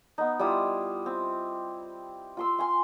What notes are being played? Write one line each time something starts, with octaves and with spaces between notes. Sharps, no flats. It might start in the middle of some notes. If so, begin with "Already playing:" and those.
B3 D#4
G3 E4 F4 D#6
C4
F4 C6 E6
F5 G#5 C6